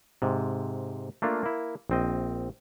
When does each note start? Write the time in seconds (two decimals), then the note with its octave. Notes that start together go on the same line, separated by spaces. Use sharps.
0.22 G#2 C3
1.22 A3 A#3 D4 F4
1.43 A#3 E4
1.90 A#1 C4 D#5